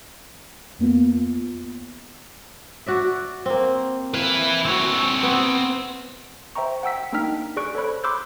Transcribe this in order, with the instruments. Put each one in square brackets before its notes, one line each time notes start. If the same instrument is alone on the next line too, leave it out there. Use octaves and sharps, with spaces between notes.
[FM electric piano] F2 A#3 B3 F4
[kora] F#4 D5 E5
A#3 C4
[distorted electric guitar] E4 B4 [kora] F5
[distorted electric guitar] C4 C#5 [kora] E4 F#4
[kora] B3
[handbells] C5 E5 G5 A#5 C#6
F#5 G5 E6 B6
A#3 D4 D#4 G5 F6 B6
G#4 D5 C#6 F#6 D7
A4 C5 C#5 B5 F#6
B5 C6 D6 E6 F#6 G6